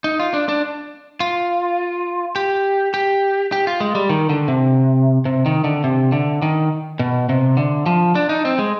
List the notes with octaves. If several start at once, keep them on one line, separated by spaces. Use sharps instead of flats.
D#4
F4
D4
D4
F4
G4
G4
G4
F4
G#3
G3
D#3
D3
C3
C3
D#3
D3
C3
D3
D#3
B2
C3
D3
F3
D4
D#4
C4
G#3